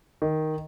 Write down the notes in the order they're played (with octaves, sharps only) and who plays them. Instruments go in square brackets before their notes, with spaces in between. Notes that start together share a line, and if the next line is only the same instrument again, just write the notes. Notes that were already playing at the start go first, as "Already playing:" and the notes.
[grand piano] D#3